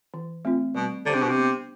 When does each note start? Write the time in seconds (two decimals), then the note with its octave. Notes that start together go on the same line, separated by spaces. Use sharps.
0.14 E3
0.45 A3 C4 F4
0.75 B2 G3
1.06 D3 D4 G4 C5
1.14 C3
1.21 B2
1.29 C3
1.37 B3